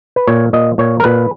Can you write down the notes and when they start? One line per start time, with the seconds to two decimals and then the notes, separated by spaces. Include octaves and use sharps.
0.16 B4
0.27 A#2 C#5
0.53 A#2 D#5
0.78 A#2 C#5
1.00 A#4
1.04 A#2 B4